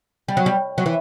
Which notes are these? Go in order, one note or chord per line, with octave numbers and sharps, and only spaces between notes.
G3
F#3
G3
F#3
E3